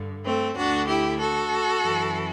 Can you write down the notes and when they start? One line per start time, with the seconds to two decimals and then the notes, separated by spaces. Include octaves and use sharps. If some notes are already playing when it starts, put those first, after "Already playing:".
Already playing: G2 D3
0.25 A3 C4
0.56 D2 D3 D4 F#4
0.88 E4 G4
1.20 F#4 A4
1.83 F#2 E3